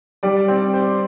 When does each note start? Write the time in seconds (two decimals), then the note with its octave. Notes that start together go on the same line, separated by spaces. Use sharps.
0.23 G3 D5
0.48 C4
0.74 C5